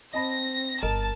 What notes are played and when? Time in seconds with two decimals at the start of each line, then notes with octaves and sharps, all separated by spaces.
0.14 C4 D#5 A5 B5 A#6
0.83 G1 A#4 D#5 A5